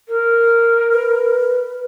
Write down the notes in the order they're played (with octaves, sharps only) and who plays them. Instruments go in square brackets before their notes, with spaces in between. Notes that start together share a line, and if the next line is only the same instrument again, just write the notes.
[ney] A#4
[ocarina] B4